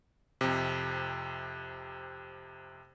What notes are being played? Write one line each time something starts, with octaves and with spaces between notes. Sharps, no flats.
F2 C3